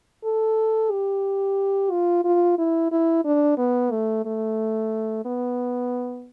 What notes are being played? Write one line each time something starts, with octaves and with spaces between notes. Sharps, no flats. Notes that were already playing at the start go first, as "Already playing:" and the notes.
A4
G4
F4
F4
E4
E4
D4
B3
A3
A3
B3